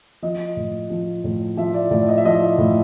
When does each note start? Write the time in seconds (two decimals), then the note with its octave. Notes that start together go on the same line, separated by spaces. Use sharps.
0.22 F3 D#5
0.57 A2
0.90 F3
1.24 A2
1.57 F3 E5
1.74 D5
1.91 A2 D5
2.08 D#5
2.17 E5
2.25 F3 D#5
2.58 A2